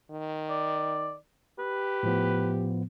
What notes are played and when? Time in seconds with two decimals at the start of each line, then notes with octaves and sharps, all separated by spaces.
0.11 D#3
0.50 D5
1.59 G4 B4
2.03 A2 F3 B3